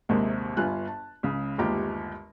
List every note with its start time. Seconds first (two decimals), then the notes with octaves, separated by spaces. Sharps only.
0.09 A#1 D#2 G#2 C3 G#3 A#3
0.57 G1 G2 F4 G#5 F#6
0.87 A5
1.23 C#2 C#3
1.58 G1 D#2 G#3 F4 G4 A#5